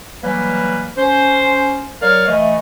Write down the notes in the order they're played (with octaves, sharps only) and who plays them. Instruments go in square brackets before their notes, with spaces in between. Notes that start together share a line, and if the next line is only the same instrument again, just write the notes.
[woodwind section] E3 F#3 G3 A#3 B4
C#4 C5
F#3 A#4 C#5 D5 F5 F6
E3 A3 D#5